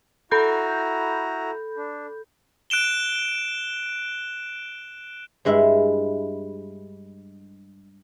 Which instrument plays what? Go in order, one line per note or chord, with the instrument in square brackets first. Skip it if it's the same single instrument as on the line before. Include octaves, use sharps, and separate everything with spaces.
[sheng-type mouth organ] E4 F#4 A#5 [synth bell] A4 B5 G6
[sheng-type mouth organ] D4
[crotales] F#6 D7 E7 G7
[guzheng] G2 G#3 E4 E5